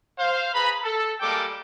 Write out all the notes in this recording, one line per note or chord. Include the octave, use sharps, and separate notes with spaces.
C5 F5
G#4 B4 A#5 B5
A4
G3 G#3 A#3 A4 G5 D6